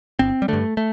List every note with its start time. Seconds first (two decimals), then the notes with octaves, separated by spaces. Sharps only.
0.19 G1 C4
0.42 G3
0.48 G2 D3 A3
0.77 A3